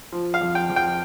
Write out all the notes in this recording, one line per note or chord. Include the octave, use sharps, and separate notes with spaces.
F3
F5
F2
G5
F2
G5